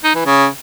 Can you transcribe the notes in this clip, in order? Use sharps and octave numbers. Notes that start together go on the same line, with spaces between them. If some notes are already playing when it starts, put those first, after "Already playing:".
D#4
E3
C#3